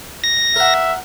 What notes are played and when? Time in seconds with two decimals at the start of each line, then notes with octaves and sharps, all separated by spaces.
0.24 A#6
0.56 A#4 E5 F#5